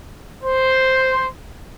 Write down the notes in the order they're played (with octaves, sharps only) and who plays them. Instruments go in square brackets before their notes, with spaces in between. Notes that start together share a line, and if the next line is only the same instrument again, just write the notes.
[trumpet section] C5